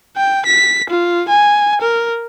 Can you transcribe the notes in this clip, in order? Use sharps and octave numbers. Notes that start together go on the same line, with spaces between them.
G5
B6
F4
G#5
A#4